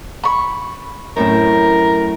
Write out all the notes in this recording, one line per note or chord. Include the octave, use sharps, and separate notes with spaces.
B5 C#6
F#2 A2 C4 A#4